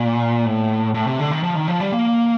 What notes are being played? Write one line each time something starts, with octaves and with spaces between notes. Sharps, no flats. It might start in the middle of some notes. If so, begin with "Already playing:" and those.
Already playing: A#2
A2
A2
C3
D3
D#3
F3
D#3
F3
G3
A#3